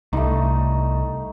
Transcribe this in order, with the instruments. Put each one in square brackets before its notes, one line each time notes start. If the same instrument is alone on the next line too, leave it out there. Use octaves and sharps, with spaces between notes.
[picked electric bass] C2 [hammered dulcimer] A3 D#4